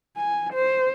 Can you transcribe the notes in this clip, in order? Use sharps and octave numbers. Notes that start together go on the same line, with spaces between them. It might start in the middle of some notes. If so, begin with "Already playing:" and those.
G#5
C5